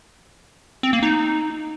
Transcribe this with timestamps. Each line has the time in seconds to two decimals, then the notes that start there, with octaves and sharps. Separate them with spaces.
0.83 C4
0.93 A#3
1.03 D#4